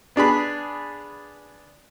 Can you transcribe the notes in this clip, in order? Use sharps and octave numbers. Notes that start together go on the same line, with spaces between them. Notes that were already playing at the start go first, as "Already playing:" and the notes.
B3 D4 G#4 B5